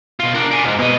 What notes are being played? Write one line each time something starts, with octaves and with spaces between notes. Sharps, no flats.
B2 F4
D4 A#4
D5 G#5
C2 G#2
B2 D#5